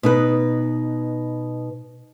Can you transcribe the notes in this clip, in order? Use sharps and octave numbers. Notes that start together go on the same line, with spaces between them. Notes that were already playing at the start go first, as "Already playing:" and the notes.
B2 D#4 B4